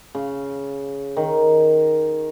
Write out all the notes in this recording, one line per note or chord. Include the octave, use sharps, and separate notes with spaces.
C#3
D#3